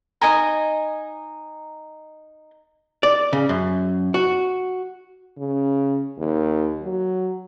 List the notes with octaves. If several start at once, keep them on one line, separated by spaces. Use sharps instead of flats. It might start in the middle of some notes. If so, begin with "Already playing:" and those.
D#4 D#5 G#5 A#5
D5
C#3
F#2
F#4
C#3
D#2
F#3